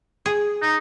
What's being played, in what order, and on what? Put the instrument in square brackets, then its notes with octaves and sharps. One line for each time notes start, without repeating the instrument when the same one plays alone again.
[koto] G#4
[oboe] D#4